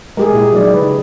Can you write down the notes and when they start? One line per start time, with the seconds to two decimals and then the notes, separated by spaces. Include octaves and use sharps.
0.17 G#3 G4 G#4 A#4
0.32 A#2 E4
0.53 F#3 D#4 D5
0.72 C#3 B4